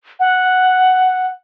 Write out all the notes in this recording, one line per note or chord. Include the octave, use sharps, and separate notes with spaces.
F#5